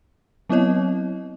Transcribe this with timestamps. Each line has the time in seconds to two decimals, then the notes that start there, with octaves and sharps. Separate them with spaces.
0.50 F#3 B3 C4 E4 C#5 D#5